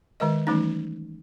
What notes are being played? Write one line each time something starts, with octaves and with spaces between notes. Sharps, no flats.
D#3 G#3 A#4 D#5
E3 G3 A3 C#4 D#4